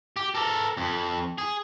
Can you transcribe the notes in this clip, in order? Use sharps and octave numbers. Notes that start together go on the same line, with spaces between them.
G4
A4 A#4
F2
G#4